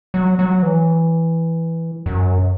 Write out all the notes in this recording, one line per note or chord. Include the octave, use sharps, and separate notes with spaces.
F#3
F#3
E3
F#2